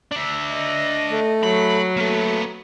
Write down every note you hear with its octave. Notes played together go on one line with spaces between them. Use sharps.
D4 E5
D#5
A3
F#3 B5
A3 A#3 B4